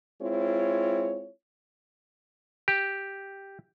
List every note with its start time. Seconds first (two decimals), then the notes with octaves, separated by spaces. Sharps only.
0.22 G#3 C4 E4 F4 C#5
2.68 G4